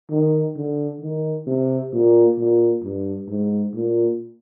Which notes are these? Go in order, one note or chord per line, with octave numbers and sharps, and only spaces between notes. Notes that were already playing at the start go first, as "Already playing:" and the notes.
D#3
D3
D#3
C3
A#2
A#2
G2
G#2
A#2